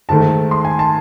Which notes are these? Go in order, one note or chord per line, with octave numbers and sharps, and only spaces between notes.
G#2 D#3 A3 A5
C6
G#5
A5